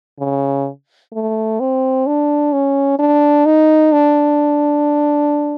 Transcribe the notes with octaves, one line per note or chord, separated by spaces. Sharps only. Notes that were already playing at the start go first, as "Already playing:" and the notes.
C#3
A3
C4
D4
C#4
D4
D#4
D4